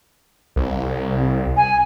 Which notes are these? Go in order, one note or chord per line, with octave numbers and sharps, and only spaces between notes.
C2
G#5